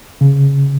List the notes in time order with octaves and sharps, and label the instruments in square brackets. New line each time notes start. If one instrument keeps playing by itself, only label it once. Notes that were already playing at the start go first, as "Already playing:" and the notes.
[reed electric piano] C#3